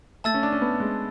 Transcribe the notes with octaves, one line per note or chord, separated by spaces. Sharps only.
A3 A5 E6 A6
C#4
D4
C#4
B3
G#3